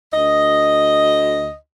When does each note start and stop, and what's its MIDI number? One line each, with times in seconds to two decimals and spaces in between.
0.14 1.55 38
0.14 1.55 75